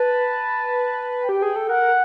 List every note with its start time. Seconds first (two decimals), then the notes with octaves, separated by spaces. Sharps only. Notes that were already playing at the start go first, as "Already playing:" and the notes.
Already playing: B4 A5
1.21 G5
1.29 G4
1.42 G#4
1.56 A4
1.69 A#4 F#5